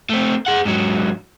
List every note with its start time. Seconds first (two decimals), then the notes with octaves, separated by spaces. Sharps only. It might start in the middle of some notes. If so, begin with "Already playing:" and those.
0.10 A3 C4
0.46 G#4 F#5
0.65 G#2 F#3